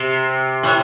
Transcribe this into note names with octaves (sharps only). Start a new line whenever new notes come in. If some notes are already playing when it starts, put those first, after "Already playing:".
Already playing: C3
A2